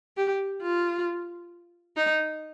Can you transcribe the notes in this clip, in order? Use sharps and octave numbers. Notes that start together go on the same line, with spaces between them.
G4
F4
D#4